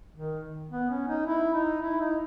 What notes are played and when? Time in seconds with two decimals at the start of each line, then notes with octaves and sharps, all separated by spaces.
0.15 D#3
0.70 B3
0.89 C#4
1.08 D#4
1.26 E4
1.54 D#4
1.82 E4
2.00 D#4